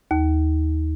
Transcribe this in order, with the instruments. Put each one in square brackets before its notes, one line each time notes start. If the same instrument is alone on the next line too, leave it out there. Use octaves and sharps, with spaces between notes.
[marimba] D#2